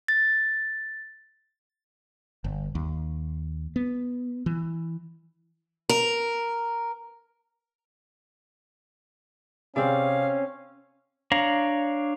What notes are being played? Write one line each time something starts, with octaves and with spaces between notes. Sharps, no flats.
A6
G1
D#2
B3
E3
A#4
C3 C4 C#4 G#4 D5 F5
D4 C#5 F5 A#5